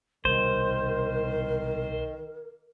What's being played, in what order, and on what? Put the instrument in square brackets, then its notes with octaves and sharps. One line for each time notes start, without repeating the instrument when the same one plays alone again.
[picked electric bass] C2 B2 G3 [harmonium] D#3 [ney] A#4 [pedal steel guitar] C5